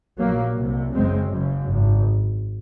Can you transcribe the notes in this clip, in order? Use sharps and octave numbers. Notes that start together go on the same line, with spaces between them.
A#1 A#2 F#3 A#3
C2 C3
F#1 F#2 C#3 G#3 C4
F#1 F#2 C#3
G#1